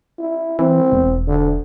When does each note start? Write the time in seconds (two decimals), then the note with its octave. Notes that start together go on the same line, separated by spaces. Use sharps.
0.19 E4
0.59 E3 C4
0.92 E1
1.27 D3